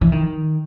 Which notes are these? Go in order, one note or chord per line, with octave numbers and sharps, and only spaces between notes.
E3
D#3